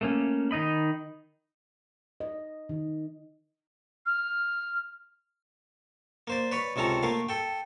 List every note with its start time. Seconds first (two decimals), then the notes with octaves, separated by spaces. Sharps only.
0.01 A3 A#3 C#4
0.51 D#3 D#4 D#5 B5
2.20 D#5
2.69 D#3
4.05 F6
6.27 A#3 C5 D5
6.51 B4 C#5 D5 B5
6.76 C#2 C3 C#4 A4 A#5
7.03 A3 A#3 A#4 F5
7.29 A4 G5